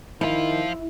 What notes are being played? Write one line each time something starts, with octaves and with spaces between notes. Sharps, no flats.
D#3 F3 E4 F4